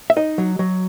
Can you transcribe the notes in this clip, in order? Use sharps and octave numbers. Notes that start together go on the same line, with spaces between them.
E5
D#4 D#5
F#3
F#3